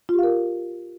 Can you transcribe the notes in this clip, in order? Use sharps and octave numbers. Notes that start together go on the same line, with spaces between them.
F4 G4 A#4 F5